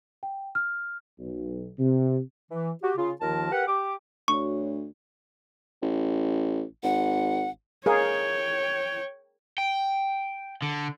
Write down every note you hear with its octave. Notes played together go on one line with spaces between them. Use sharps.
G5
F6
B1
C3
E3
F#4 G4
C#3 F4
D#2 D#3 F3 F4 A#4 A5
G4 A#4 B4 F#5
G4 D6
D2 F#4 C#5 C#6
A1
G#1 F#5
G#4 A#4 C#5 F5 G5
G5
D3